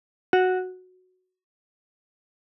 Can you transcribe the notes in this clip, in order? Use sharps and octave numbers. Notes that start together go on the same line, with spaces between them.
F#4